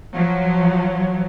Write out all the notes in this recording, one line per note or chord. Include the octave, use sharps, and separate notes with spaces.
F3 F#3